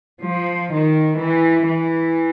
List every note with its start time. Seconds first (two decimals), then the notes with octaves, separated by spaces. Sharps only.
0.25 F3
0.73 D#3
1.21 E3
1.69 E3